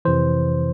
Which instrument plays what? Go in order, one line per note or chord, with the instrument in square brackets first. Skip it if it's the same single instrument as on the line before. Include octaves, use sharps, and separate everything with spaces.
[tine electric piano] F2 C3 E3 C5